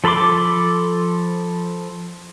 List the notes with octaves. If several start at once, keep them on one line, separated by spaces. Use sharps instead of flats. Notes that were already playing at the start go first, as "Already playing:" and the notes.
F3 A4 B5 C6 D6